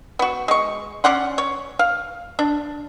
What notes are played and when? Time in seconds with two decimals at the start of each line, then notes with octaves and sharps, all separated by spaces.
0.19 B3 F#4
0.48 G#3 C#6
1.04 C#4 D5 F#5 C6
1.38 C#5
1.79 F5
2.39 D4